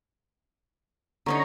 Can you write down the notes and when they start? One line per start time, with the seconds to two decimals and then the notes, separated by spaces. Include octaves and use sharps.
1.26 D3 C#4 D#4 A#5 C#6